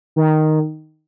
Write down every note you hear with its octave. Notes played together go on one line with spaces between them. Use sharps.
D#3